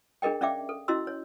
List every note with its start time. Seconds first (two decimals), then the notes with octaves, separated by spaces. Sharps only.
0.22 D4 G#4 A#4 D#5 G5
0.41 C#4 D5 E5 F5 G5 D6
0.69 A4
0.88 C#4 E4 F#4 D#5 C6 E6
1.07 C#5